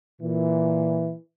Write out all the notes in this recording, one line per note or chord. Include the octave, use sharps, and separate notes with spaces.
A#2 E3